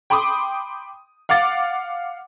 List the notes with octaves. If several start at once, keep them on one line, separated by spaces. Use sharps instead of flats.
G5 B5 C6 D6 D#6
F5 F#5 D6 A6